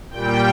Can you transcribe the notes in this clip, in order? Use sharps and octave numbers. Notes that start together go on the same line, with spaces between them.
A#2 G3 G5